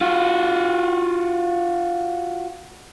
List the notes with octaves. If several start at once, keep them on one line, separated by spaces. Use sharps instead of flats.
F4 F#4